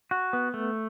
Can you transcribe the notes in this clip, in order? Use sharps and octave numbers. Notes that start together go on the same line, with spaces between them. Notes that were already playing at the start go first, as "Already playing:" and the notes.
F#4
B3
A3